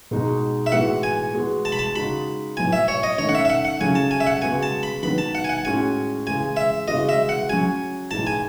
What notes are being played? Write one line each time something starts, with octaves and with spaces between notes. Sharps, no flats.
B2 G#3 D#4 F#4
E5
A2 E3 G#3 B3 F#4 F#5
G#5
E3 G#3 B3 F#4
A5
B5
A5
C#3 G#3 D#4 F#4 B5
A2 F#3 B3 E4 G#5
E5
C#5
D#5
D#3 A3 C#4 C#5
F#5
E5
E5
F#5
F#5
C#3 F#3 A3 C#4 E4 G#5
A5
G#5
E5
F#5
C#3 G#3 B3 F#4 G#5
A5
B5
D#3 F#3 B3 B5
A5
F#5
G#5
F#5
A2 G#3 C#4 F#4 G#5
C#3 E3 G#3 G#5
E5
C#3 E3 G#3 B3 F#4 D#5
E5
F#5
F#3 C#4 F#4 G#5
A2 E3 G#3 D#4 A5
G#5